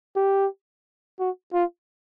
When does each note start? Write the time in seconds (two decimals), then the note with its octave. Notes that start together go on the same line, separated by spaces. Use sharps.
0.16 G4
1.19 F#4
1.53 F4